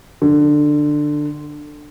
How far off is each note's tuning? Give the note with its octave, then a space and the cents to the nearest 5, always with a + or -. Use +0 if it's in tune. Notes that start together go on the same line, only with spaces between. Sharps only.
D3 +15